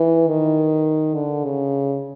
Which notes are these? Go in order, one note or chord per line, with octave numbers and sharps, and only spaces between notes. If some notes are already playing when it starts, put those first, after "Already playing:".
Already playing: E3
D#3
D3
C#3